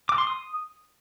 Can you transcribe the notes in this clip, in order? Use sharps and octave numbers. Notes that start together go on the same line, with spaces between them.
D6
C6
D#6